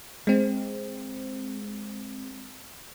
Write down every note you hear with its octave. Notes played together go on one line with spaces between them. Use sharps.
G#3 C4